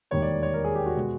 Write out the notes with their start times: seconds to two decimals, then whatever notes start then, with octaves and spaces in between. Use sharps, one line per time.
0.11 E1 D#2 D#3 G3 A#3 C#5
0.22 D5
0.43 C#5
0.54 A#4
0.64 G#4
0.75 G4
0.86 F#4
0.97 B2 G#3